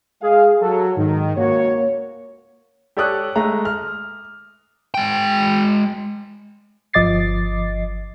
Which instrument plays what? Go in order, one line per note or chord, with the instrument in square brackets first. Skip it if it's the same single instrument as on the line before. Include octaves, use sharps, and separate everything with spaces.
[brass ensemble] G#3 F5 [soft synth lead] G#4
[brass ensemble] F#3 [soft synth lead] A4
[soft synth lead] G#2 [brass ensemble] D#3
[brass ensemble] C#2 F#4 C#5 [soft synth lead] A#3
[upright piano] G4 A4 C#5 D5 D#6 F#6
G#3 A3 A#5
F6
[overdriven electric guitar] G#3 G5
[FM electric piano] G1 F3 D#5 D6 A6 C7